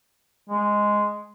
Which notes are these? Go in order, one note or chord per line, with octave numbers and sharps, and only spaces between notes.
G#3